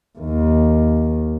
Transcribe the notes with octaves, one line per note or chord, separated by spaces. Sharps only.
D#2